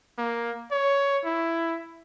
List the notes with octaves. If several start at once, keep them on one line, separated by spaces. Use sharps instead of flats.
A#3
C#5
E4